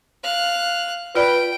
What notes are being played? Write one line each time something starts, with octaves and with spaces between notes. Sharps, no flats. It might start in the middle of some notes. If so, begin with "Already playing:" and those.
F5 F#6
F4 B4 D5 G5